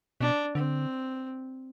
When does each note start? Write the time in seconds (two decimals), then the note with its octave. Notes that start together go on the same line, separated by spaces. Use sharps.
0.20 B2 D4
0.55 D3 C4